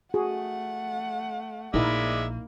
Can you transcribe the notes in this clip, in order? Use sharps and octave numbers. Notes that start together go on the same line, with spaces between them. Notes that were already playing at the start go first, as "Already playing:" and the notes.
A3 F#4 G#4 F#5
A#1 G#3 A#3 D#4 E4 A#4 D5 E5